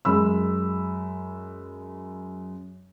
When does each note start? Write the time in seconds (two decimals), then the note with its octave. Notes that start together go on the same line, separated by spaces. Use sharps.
0.05 F#2 G#3 B5 E6